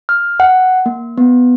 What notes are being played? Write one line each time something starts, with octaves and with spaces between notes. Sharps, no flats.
F6
F#5
A#3
B3